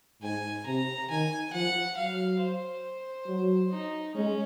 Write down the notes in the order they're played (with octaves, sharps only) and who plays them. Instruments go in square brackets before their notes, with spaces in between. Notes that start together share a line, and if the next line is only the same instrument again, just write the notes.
[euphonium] G#2 [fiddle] G#5
[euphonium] C3 [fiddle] A#5
[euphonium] D#3 [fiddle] G#5
[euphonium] F3 [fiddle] F#5
[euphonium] F#3 [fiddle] F5
[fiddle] C5
[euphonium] F#3
[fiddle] D#4
[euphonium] G#3 [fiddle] C#4